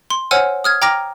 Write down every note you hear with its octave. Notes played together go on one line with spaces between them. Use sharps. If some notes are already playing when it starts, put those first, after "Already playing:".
C6
C5 C#5 F#5 G#5 E6 F6
D#6 F6 G#6
G5 A#5 D6 F6 A#6